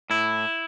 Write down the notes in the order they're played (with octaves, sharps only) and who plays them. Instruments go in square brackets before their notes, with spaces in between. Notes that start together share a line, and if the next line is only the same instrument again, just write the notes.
[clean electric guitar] A2 E4